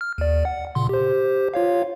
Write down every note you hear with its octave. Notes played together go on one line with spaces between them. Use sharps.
F6
D#2 D5
F#5
A#2 C#3 C6
G4 C5
F4 C#5 F5